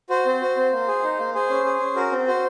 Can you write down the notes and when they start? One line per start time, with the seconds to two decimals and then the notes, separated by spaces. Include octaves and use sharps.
0.10 F#4 C5
0.26 C4
0.41 F#4
0.57 C4
0.72 A#3
0.88 G#4
1.03 D#4
1.19 A#3
1.34 G#4 C5
1.50 C#4
1.66 G#4
1.80 C#4
1.96 F#4 A#4
2.11 C4
2.27 F#4 C5